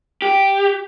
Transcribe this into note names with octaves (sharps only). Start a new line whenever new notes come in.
G4